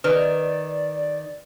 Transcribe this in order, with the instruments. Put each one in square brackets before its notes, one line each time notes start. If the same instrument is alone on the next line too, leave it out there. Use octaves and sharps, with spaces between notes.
[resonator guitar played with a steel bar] D#3 [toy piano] B4 [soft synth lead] D5